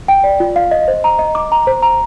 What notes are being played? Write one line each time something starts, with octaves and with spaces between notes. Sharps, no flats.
G5
D5
F4
F5
D#5
C5
A#5
D#5
D6
A#5
C5
A#5